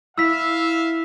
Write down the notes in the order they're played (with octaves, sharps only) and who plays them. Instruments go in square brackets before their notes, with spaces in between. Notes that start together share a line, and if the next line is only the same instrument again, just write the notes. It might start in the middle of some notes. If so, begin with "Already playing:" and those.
[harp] E4 [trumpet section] E5 F5 [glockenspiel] E6 B6